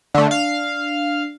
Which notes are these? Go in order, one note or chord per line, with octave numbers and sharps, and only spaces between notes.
D3 A3 D4
F5